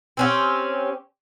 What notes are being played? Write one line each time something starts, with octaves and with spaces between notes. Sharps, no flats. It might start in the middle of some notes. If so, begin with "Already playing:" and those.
C4 C#4 G4